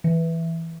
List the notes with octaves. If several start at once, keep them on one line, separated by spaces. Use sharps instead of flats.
E3